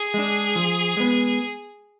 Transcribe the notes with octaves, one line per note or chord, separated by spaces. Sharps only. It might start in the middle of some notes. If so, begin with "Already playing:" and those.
Already playing: G#4
G#3 D4
F3
G#3 B3